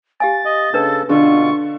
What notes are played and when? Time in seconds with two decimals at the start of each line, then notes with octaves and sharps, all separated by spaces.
0.20 G4 F5 G#5 A6
0.45 D#5
0.74 C#3 D4 A4 B4
1.09 B2 D3 F4 C#6